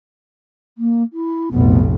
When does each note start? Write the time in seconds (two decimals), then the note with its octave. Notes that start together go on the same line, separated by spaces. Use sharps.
0.78 A#3
1.13 E4
1.52 F1 B1 A2 B3